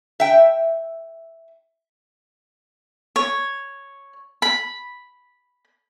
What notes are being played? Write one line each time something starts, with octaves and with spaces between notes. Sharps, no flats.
E5 G5
C#5
B5